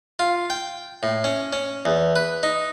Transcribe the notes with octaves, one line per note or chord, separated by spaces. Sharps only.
F4
G5
A2
C#4
C#4
E2
B4
D#4